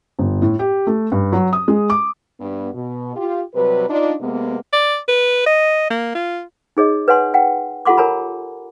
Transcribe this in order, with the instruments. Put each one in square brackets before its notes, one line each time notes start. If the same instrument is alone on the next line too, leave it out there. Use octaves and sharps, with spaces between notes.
[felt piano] G1
A2
G4
A3
G2
F#3
D#6
G#3
D6
[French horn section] G2 B3
B2
F4 G4
C3 F#3 G3 B4
D4 D#4 F4
C3 G#3 A#3 B3
[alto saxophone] D5
B4
D#5
A#3
F4
[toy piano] D#4 G#4 C#5 D#5
B4 C#5 F#5 G#5 C6
F#5 G5
F4 G4 A4 F#5 C6 D6
A#4 C#5 G#5 A#5 B5